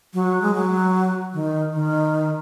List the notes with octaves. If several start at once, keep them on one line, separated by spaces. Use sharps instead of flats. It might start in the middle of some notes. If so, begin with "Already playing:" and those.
F#3
G#3
F#3
D#3
D#3